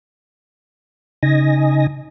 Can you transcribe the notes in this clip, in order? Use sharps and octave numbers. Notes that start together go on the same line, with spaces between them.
C#3 D#4 D#5 G#5 A#6